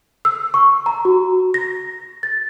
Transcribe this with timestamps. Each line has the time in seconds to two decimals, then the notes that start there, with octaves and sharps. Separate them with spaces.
0.25 E6
0.54 C#6
0.86 A#5
1.05 F#4
1.54 A#6
2.23 A6